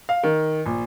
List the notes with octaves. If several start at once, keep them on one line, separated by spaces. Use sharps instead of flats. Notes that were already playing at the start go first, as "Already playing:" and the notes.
F5
D#3
A#1